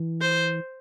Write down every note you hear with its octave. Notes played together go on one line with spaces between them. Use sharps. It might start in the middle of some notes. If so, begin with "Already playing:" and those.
Already playing: E3
C5